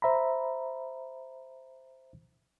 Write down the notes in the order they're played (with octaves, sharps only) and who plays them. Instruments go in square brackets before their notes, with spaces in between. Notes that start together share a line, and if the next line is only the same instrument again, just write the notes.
[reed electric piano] C5 E5 A#5 B5